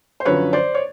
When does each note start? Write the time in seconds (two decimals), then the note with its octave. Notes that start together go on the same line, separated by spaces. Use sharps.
0.20 C5
0.25 F#2 D3 F3 B4 C#5
0.53 C5 D5
0.74 C#5